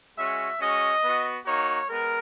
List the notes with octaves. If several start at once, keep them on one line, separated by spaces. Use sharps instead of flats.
G#3 C#4 F#4 E5
G#3 C#4 F#4 D#5
B3 F#4
A#3 D#4 F#4 C#5
G#3 B3 A#4